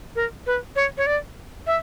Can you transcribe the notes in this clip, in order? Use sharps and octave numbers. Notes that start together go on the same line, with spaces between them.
A#4
B4
C#5
C#5
D5
E5